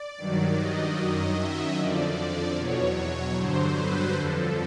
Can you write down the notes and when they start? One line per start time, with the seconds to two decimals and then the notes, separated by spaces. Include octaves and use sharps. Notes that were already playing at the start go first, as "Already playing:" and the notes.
Already playing: D5
0.18 G2 D#3 F#3
0.57 D#5
0.98 F#2 D#3 F#3
1.38 E5
1.76 F2 D3 F3 D5
2.17 D5
2.56 E2 B2 F#3 C#5
3.35 G2 D3 F#3 C5
3.75 B4
4.14 F2 D3 F3 A4